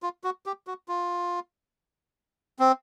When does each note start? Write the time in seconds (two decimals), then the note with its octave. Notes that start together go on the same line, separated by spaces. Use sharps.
0.03 F4
0.24 F#4
0.46 G4
0.67 F#4
0.88 F4
2.59 C4